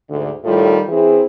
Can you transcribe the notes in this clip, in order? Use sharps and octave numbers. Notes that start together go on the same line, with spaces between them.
D2 G#2 D3
A2 D#3 G3 F4 A4
E3 C4 E4 G#4